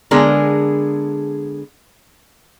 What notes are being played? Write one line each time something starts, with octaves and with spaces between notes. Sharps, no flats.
D3 G#3 B3 D4 G#4 A#4